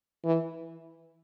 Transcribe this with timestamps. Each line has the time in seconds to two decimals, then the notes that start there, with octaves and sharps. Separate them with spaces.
0.25 E3